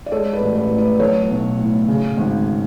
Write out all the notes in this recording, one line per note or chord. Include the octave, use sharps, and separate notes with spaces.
D5
G#3 A4 C#5
B4 D5
A1
B4 D5
A2
B4 D5
F#3 A4 C#5
B1
A2
C#3
G#1